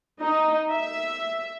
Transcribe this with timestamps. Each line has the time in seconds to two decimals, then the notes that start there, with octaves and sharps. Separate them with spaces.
0.22 D#4
0.73 E5